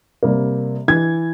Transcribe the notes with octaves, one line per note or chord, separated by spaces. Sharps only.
C3 G3 A#3
E3 G#6